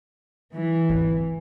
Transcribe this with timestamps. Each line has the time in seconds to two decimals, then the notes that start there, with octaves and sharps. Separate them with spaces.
0.54 E3
0.89 G#1 D2